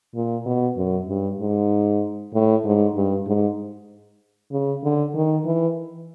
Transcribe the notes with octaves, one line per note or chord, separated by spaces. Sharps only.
A#2
B2
F#2
G2
G#2
A2
G#2
G2
G#2
C#3
D3
D#3
E3